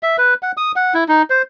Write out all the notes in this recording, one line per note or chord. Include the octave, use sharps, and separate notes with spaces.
E5
B4
F#5
D#6
F#5
E4
D#4
C5